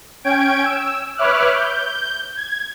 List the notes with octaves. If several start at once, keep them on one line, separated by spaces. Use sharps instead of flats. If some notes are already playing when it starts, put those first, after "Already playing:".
C#4 G5 G#6 D7
E6
B4 C#5 E5 D6 F6 F#6
G6
G#6